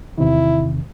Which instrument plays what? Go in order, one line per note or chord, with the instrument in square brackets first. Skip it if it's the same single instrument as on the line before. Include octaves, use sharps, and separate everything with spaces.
[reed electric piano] E2 C3 D#3 [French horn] E4